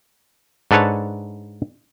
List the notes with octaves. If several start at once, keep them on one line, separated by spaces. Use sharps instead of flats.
G#2 D4 A4 B4 C#5 A5